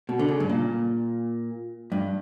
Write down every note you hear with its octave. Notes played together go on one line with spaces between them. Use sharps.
B2
D3
C#3
G2
A#2
G2